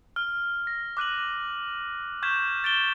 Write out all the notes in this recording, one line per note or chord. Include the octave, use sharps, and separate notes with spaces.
F6
A#6
D6 F#6 D#7 F#7
C#6 F6 G6 G#6 B6 E7
A6 D7 E7 G7